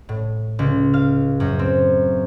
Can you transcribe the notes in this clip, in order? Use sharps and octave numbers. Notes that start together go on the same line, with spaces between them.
A2
C#2
F5
F#2
C4